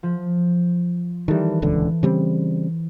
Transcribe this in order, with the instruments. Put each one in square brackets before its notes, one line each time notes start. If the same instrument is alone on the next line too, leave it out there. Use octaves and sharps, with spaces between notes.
[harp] F3
[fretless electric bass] D#3 G3 [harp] E3 A4
[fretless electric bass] D#1 C#2 D3
C#3 G3 C4